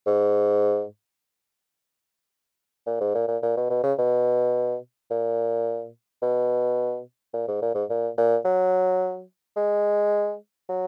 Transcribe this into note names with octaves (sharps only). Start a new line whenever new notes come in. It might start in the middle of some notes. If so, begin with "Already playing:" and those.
G#2
A#2
G#2
A#2
A#2
A#2
B2
B2
C#3
B2
A#2
B2
A#2
G#2
A#2
G#2
A#2
A#2
F#3
G#3
F#3